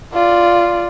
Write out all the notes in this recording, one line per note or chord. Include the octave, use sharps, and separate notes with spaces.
F4 D5